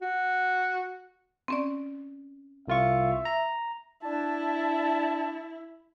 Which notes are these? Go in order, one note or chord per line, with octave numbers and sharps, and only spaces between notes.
F#4
C4 C#4 D5
C2 F4 E5 C#6
A#5
D4 E4 A5